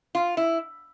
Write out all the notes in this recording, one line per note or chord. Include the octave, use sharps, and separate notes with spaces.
F4
E4